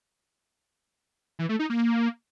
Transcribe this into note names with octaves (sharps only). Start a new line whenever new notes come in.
E3
A3
D#4
A#3